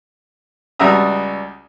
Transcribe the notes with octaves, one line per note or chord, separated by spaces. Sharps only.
C#2 G3 F#4 E5 A#5 D#6